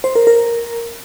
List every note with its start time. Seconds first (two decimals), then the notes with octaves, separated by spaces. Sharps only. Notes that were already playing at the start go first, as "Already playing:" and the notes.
0.04 C5
0.15 A#4
0.27 A#4